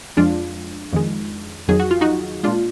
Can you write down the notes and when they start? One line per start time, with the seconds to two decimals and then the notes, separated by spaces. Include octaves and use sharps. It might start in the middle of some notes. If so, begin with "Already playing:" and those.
0.17 F2 F3 G#3 D4 F4
0.93 F2 D#3 G#3
1.68 F2 D#3 F#3 G#4
1.80 F#4
1.91 F4
2.01 D#4 F#4
2.43 A#2 G#3 D4 F4